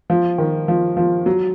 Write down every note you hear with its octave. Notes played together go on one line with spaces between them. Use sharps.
F3
D#3
F3
F3
F#3